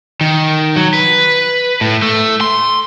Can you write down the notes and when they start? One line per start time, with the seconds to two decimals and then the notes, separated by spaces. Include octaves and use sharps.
0.21 D#3
0.76 F#3
0.94 B4
1.81 A2
2.02 A3
2.41 C6